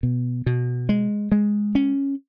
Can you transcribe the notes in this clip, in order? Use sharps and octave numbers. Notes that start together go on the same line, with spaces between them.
B2
B2
G#3
G#3
C#4